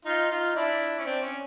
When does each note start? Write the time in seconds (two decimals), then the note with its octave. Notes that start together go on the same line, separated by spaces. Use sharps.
0.05 D#4 F4
0.30 D#4 F4
0.56 D4 E4
0.99 C#4
1.05 C4 D4
1.22 C#4